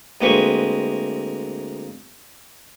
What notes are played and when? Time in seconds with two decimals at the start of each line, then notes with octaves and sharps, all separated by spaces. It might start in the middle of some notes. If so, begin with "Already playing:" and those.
0.21 D2 G#3 A#3 C4 B4 C#6